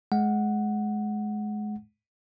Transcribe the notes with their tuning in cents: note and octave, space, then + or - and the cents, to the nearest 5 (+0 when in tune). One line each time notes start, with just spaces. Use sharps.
G#3 +25 F#5 +0